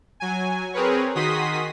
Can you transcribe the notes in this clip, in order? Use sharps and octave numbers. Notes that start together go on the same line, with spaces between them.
F#3 G#5
C4 G#4 A#4 B4 C#5
D#3 F#4 G#4 C6 D#6 B6